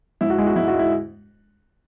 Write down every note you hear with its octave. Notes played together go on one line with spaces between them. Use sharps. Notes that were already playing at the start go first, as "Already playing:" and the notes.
G#2 E4
F#4
G#3 E4
F#4
G#2 E4
F#4
G#3
E4